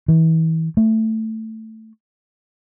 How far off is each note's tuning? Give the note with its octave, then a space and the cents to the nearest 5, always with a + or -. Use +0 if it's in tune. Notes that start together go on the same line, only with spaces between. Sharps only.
E3 -35
A3 +10